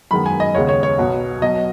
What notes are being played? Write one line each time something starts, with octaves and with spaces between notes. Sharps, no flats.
F#2 D#3 G#3 B3 B5
G#5
D#5
D#2 C#3 G#3 B3 C#5
C#5
C#5
B1 B2 F#3 B3
B1 B2 F#3 B3 D#5